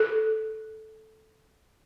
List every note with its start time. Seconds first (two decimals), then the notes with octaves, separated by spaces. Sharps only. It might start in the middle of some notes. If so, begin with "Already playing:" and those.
Already playing: A4